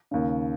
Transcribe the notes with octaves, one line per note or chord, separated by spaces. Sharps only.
D#2 C#3